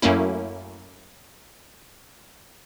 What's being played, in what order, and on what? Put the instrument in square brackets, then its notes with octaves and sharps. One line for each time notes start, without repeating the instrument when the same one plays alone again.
[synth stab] F#2 F#3 A3 A#3 C#4 E4